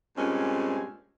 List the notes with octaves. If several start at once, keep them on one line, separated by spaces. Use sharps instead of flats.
G2 A#2 G#3 C4 C#4